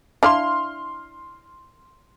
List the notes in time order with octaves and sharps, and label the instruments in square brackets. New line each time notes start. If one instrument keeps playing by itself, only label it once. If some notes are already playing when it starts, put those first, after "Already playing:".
[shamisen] D4 E4 F5 [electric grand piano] C6 F6